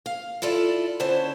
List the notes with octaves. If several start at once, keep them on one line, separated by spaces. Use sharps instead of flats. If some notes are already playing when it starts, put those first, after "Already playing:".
F5
E4 F4 A4 D5
D3 C#4 E4 C5 A5